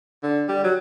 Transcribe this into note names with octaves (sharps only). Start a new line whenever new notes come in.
D3
G3
F#3